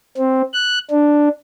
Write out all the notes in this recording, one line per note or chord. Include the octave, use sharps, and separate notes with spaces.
C4
F#6
D4